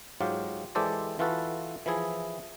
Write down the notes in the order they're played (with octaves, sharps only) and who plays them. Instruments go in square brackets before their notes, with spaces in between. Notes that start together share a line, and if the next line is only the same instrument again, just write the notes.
[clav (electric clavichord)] G#2 F#3 F4 G4
E3 G#3 G4 A4 C5 D5
E3 F4 F#4 A4 B4
E3 F3 E4 G#4